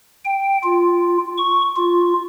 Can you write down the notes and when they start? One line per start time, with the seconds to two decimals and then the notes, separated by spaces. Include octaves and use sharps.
0.25 G5
0.64 F4
1.38 C#6
1.77 F4